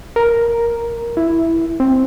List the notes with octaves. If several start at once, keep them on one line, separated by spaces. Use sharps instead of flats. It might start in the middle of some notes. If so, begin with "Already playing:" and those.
A#4
E4
C4